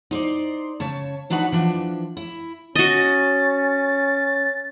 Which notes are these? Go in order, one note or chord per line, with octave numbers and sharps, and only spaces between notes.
D#4 C5 D5
C#3 C#5 A5
F#3 D4 D#4 F#4 B4 F#5
E3 F3 D4
E4
C#4 F#4 D#5 A6